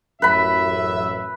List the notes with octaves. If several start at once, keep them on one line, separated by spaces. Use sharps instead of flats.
A1 F#2 B4 E5 B5